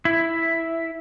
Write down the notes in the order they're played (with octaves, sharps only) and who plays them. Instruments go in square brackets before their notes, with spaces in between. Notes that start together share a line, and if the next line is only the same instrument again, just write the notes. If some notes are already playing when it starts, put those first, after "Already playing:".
[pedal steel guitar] E4